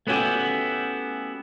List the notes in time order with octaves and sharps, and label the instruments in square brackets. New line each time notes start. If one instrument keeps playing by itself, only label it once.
[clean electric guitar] A3 B3 C#4 E4 F#4 G4